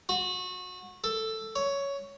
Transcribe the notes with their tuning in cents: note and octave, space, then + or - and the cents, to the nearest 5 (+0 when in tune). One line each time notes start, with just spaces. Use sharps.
F#4 -25
A4 +10
C#5 +10